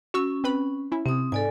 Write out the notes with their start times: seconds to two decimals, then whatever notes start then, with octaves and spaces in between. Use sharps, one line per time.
0.14 C#4 F#4 C#6 E6
0.44 C4 B4 B5
0.92 C#4 E4
1.06 C3 C4 D#6
1.32 G#2 A4 D5 G#5